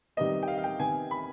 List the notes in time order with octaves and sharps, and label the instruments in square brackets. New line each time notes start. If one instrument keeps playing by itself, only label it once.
[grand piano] C3 D#3 G3 B3 D#5
G5
F5
F5
G5
C3 D#3 B3 G#5
B5